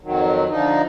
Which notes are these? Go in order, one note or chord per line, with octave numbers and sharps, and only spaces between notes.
F2 D#3 F#3
D3 F3 D#4